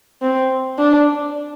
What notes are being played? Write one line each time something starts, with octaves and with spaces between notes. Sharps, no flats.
C4
D4